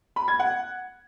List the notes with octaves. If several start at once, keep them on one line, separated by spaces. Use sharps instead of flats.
B5
G#6
F#5